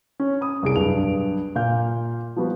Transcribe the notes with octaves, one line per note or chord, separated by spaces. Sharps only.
C#4
B5 D#6
C2 G#4 D7
B1 G2 F7
A#2 F5 G6
F3 G3 B3 F#4